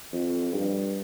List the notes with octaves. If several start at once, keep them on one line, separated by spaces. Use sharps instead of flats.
F2
G2